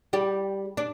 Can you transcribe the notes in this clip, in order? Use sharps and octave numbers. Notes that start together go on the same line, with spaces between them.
G3 G4
D4